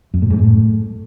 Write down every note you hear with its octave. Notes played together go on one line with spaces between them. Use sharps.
F#2
A2
G#2
A2